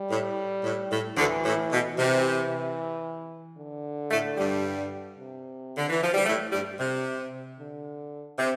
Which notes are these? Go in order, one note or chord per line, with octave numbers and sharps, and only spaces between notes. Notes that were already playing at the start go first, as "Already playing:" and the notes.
Already playing: G3
A2
A2
A2
D2 D3 E3
A2
B2
C3 E3
D3
A2 A3
G2 G3
C3
D3
E3
F3
G3
A2 A3
G2 G3
C3
D3
C3